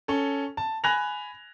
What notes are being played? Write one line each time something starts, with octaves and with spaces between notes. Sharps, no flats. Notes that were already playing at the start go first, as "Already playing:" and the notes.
C#4 A4
A5
G#5 B5 F#6 G#6 A#6 F7